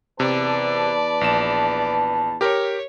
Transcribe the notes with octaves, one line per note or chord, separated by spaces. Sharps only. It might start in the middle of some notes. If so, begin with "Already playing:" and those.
E2 C3 B4 D5 A5
A#1 E7
G4 A#4 C#5